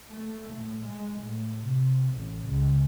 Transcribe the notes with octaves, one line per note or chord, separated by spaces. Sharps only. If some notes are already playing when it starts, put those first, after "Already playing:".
A3
A2
G#3
A2
C3
A1
C#2